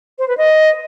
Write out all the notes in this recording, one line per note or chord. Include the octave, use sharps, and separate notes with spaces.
C5
B4
D#5